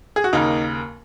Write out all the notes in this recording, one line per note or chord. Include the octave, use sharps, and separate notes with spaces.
G#4
F#4
D#2 C#3 A#3 D#4